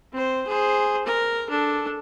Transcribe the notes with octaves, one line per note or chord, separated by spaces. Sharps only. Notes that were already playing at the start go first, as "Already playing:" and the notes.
C4 C5
G#4 C5
A#4
D4 A4